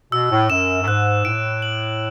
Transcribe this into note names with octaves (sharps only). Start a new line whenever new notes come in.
B2 E6
A2
F#2 E7
F#2
G#2 F#6
A2 D7
F#7